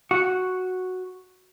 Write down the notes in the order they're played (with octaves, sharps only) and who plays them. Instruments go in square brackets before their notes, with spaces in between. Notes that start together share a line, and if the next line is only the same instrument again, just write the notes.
[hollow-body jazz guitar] F#4